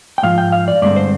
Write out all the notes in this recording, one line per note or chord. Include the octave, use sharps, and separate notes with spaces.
G5
G#2 F3 F4 F5
G5
F5
D5
G2 D3 G#3 C4 D5
C5